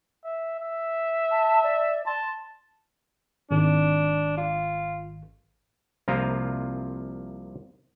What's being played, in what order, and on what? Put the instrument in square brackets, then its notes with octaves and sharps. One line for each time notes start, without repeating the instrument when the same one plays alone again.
[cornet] E5
E5
[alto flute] A5
D5
[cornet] A5 [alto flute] C6
[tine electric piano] G#1 [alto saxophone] D4
[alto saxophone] F4
[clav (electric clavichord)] C2 C3 F3 A#3 F4 A#5